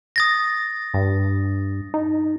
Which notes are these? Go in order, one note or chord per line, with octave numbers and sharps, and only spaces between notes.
D#6 A6 A#6
G2
D#4